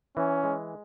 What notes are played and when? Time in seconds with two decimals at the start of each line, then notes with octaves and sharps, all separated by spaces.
0.17 E3 C#4
0.44 G#3